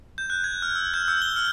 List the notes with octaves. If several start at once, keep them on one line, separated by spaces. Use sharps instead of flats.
G6
F#6
G#6
F6
E6
G6
E6
G7
F6